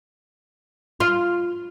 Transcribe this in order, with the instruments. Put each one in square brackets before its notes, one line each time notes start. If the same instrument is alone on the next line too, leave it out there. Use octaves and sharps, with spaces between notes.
[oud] F4